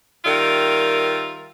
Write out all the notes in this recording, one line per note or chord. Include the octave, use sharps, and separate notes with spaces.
D#3 G3 F4 A#4 E5